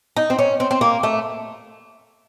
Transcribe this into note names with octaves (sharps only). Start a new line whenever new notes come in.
D#4
C4
C#4
C4
C4
A#3
A3